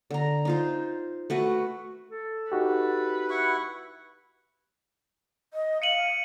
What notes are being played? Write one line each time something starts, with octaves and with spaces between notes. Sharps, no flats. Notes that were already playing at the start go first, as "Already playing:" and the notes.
D3 A#5
D#4 F4 C5
A3 F#4 B4
A4
D#4 F#4 G4 B4
E4 F#5 C#6
D#5
F5 C#7 D#7 F#7